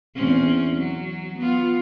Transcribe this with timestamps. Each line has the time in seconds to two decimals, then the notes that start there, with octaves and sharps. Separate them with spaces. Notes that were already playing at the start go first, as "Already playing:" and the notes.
0.14 E2 C4 C#4
0.76 F#3
1.40 B3 F4